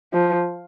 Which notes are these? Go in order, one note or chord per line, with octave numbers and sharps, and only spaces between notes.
F3